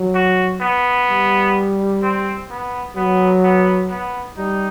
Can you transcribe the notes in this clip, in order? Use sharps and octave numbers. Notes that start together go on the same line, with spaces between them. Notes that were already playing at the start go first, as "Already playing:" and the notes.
Already playing: F#3
F#4
B3
G3
C4
B3
F#3 B3
B3
B3
G3 D#4